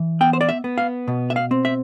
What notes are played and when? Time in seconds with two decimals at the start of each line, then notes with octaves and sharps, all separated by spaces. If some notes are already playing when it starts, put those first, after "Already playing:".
Already playing: E3
0.21 B3 G5
0.33 C5
0.41 D5
0.49 E5
0.64 B3
0.78 F5
1.08 B2
1.30 E5
1.36 F5
1.51 C4
1.65 E5